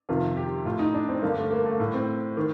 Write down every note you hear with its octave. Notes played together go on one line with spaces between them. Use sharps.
F2 C3 D#3 F4
G4
A2 F4
D#4
D4
C4
G2 D3 A#3
A3
A#3
A3
A2
C4
D#3